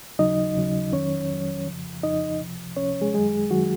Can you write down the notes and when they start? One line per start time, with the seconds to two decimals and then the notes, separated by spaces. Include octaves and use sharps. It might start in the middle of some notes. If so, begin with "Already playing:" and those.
0.19 D#2 C#3 F#3 D#4 D#5
0.56 D#2 C#3 F#3
0.92 F2 D#3 F#3 C#4 C#5
1.30 F2 D#3 F#3
1.66 F2 C#3 F3
2.03 F2 C#3 F3 D#4 D#5
2.40 C#2 C3 F3
2.77 C#2 C3 F3 C#4 C#5
3.02 G#3 G#4
3.14 F#2 D#3 F#3 G#3 G#4
3.51 D#3 F#3 F#4